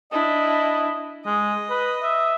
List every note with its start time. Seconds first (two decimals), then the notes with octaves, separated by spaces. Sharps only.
0.12 D4 E4 D#5
1.26 G#3 D#5
1.70 B4
2.02 E5